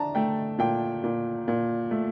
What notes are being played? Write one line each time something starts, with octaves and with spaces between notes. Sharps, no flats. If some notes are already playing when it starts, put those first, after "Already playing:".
Already playing: D4 A5 A#5
A3 G5
A#2 G5
A#2
A#2
A3